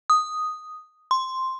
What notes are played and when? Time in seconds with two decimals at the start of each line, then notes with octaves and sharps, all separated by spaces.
0.10 D#6
1.11 C6